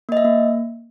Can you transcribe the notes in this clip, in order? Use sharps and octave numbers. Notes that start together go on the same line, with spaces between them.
A#3 D#5
E5
A#3